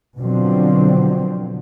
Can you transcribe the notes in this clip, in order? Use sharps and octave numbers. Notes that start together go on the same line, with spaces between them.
B2 D3 F3 F#3 C4